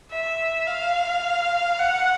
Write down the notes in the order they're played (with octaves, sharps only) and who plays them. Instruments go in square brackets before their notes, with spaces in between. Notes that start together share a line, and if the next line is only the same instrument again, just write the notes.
[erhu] E5
F5
F#5